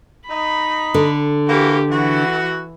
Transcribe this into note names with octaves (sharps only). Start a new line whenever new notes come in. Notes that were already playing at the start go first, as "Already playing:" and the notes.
D#4 B5
D3
E3 A#3 F#4 G4
E3 F#4